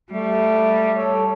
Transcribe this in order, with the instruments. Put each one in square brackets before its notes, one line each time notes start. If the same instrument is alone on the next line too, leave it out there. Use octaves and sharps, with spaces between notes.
[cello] G3 [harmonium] A3
[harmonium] A4 C#5